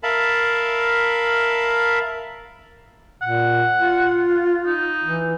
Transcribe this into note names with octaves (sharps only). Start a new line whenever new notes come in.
A#4 E5 F5 A5 B5
A#2 F#5
F4
D#4
E3